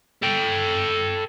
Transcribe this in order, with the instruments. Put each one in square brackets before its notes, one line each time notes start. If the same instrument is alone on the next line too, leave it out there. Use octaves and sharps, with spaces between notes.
[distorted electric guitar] A4 G5